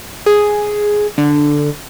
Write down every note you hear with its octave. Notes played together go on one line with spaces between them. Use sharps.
G#4
D3